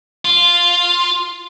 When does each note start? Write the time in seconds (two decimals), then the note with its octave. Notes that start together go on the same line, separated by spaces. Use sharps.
0.25 F4